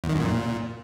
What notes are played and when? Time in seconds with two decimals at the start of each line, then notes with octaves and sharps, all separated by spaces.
0.04 E2
0.09 D#3
0.15 F#2
0.21 A#2